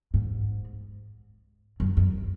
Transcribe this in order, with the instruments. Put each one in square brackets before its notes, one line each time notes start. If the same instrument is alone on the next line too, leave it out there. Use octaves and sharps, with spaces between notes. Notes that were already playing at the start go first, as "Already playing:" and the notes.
[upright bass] G#2
F#2
F#2